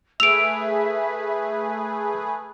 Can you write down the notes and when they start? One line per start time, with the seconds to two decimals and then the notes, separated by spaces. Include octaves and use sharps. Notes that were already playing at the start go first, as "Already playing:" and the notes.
0.20 A3 G#4 B4 E5 E6 D7 F7